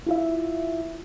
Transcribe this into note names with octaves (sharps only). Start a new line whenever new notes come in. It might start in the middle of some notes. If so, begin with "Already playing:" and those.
E4 F4 E5